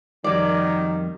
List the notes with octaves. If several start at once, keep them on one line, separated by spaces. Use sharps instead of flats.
F2 D#3 F#3 G3 D5